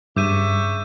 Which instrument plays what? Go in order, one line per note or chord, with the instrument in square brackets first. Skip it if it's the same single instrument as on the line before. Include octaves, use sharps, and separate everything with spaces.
[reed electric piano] G2 [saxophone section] C#3 C#5 E5 [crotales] D6 G6 D#7